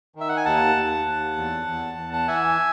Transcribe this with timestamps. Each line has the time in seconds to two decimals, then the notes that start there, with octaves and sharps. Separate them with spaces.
0.15 D#3
0.20 E5
0.29 F#5
0.37 G#5
0.45 D#2 F#5 A5
0.76 D#2
1.06 D#2
1.37 E2
1.67 E2
1.97 E2
2.13 A5
2.28 E3 E5 G#5